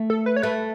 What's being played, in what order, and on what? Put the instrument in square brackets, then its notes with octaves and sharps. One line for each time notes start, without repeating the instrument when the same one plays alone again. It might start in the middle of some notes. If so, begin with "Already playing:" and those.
Already playing: [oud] A3
[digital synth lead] A4
B4
C#5
[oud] A3 [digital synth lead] B4